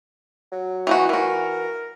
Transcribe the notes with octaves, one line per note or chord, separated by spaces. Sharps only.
F#3
E3 D#4 F#4
E3 F#4 A#4